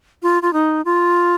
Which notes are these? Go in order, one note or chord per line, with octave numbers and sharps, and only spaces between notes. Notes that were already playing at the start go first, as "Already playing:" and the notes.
F4
F4
D#4
F4